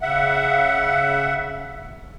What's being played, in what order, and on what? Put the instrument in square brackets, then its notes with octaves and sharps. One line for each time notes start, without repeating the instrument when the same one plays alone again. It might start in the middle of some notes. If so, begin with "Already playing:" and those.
[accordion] C#3 E5 F#5